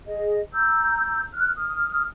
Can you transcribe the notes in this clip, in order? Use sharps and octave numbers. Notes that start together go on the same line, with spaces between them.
G#4 D#5
A#5 E6 G6
F6 F#6
D#6 F6